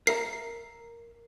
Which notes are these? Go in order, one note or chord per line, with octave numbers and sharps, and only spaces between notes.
A#4 E5 A#5 C7